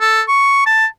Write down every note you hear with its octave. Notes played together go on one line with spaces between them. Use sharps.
A4
C#6
A5